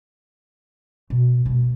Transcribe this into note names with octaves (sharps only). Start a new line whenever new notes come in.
B2
B2 A3